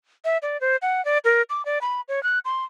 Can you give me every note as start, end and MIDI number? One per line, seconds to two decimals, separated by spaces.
0.25 0.38 76
0.42 0.60 74
0.61 0.77 72
0.82 1.04 78
1.05 1.18 74
1.25 1.42 70
1.50 1.65 86
1.65 1.79 74
1.81 2.01 83
2.08 2.23 73
2.23 2.39 90
2.45 2.65 84